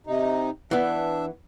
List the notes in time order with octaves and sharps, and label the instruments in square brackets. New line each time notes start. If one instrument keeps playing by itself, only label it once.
[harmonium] C3 D#4
[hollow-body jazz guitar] E3 B3 [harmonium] D4 E5